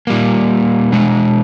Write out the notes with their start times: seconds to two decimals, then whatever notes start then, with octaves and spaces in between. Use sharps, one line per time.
0.07 A#2 G3 A#3
0.92 B2 G#3